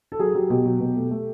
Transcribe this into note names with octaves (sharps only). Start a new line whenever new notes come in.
A4
F#3 G#4
F#3 G4
B2 G4
F#3
B2
A3
A3